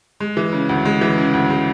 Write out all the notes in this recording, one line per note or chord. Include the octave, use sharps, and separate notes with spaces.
G#3
E3
C#3
D2
G#3
E3
C#3
D2
G#3